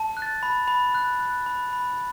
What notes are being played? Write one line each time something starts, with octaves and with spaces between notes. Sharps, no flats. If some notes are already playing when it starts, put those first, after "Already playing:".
Already playing: A5
F#6
A6
B5
B5
F#6
F#6
B5
B5